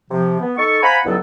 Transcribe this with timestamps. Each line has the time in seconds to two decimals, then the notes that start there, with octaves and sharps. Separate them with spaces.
0.11 C3 F3
0.41 B3
0.58 D#4 A4 C#6
0.82 C5 F5 F#5 G#5 A#5 B5
1.05 C#2 G2 F#3 B3 E4 A4